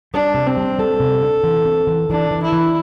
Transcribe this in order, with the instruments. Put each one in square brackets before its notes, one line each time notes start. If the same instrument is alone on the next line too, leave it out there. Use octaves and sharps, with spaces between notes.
[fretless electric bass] G3 [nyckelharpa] D4
[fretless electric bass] C3
[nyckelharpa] C4
[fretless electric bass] G3
[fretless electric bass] G3 [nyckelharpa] A4
[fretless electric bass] C3
D4
E3
C4
E3
[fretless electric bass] E3 [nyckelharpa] D4
[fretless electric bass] E3
[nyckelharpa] E4
[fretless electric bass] E3